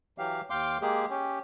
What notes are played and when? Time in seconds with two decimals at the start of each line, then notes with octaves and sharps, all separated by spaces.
0.18 E3 F#3 G4 F5
0.50 D#2 F5 G5 C6 D6
0.82 G#3 A#3 G4 G#4
1.10 C#4 G4